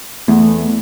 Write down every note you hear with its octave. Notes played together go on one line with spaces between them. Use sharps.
E2 A3